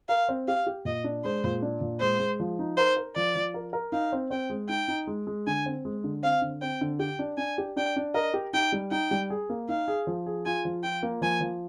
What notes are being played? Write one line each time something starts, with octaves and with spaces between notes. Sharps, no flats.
A#4 F5
C4
G4 F5
G4
A#2 D#5
D4
G#3 C5
A#2
D4
A#2
G#3 C5
G#3
F3
D#4
A#4 C5
A#4
F3 D5
F3
A#4
A#4
D#4 F5
C4
C4 G5
G#3
D#4 G5
D#4
G#3
G#3
D3 G#5
C4
G#3
D3
C4 F5
D3
C4 G5
D3
G4 G5
D4
D4 G#5
G4
D4 G5
D4
A#4 D#5
G4
D#4 G5
G3
D#4 G5
G3
G#4
A#3
D#4 F5
G#4
F3
G#4
F4 G#5
F3
F4 G5
A#3
F3 G#5
F3